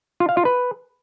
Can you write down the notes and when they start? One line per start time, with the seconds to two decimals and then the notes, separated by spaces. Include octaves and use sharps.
0.20 F4
0.29 F5
0.37 F4
0.45 B4